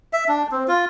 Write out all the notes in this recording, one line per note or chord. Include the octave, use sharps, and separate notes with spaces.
E5
D4
C4
F4